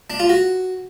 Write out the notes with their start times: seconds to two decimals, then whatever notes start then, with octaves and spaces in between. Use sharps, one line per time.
0.10 D4
0.20 F4
0.29 F#4